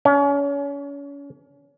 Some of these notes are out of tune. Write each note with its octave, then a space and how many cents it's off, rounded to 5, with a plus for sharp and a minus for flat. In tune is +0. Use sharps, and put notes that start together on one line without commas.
C#4 +35